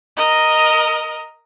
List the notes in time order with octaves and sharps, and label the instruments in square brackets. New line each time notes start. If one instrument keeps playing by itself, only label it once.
[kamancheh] A#4 D#5